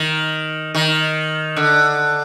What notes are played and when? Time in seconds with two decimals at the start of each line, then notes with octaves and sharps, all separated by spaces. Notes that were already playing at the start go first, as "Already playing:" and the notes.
Already playing: D#3
0.75 D#3
1.56 D3